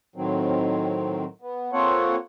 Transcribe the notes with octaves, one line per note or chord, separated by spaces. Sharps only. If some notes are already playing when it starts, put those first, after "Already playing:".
A2 D#3 F#3 C4
B3
A#3 C4 F4 A4 C#5 F#5